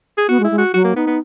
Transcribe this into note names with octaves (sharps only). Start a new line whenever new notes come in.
G#4
B3 F#4
G#3
E4
G#3
F#4
F#3 F#4
A#3
B3 D#4
B3